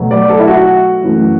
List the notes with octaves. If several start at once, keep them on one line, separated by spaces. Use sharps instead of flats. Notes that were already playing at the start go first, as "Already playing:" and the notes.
Already playing: B2 F#3 A3
D5
A4
E4
F#4
F#2 E3 A3